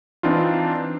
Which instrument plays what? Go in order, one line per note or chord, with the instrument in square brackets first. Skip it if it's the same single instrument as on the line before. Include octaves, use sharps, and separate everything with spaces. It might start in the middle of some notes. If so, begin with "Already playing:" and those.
[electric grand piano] E3 C4 D4 D#4 F4